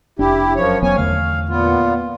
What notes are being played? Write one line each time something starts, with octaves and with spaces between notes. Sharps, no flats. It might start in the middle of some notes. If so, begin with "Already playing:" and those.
F1 D4 E4 G4
F#2 F3 C#5
F1 F#3 B3 C#4 C#5 G#5
E2 D3 A3 F5
A#2 B3 F4